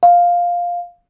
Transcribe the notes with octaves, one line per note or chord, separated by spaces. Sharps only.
F5